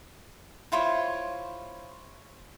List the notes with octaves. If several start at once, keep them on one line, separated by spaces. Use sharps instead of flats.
E4 F4 C5 C#5